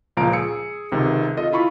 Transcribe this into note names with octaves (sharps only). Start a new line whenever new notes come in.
C#2 A#2 F3 F5 A#5 D7
G#4 E6 C#7
C#2 C3 D#3
F4 A4 D#5
E4 F4 B5 C#6